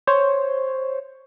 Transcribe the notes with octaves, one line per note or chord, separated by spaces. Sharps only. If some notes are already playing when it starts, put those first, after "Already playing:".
C5 C#5